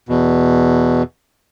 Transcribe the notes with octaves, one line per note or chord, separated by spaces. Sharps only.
E2 B2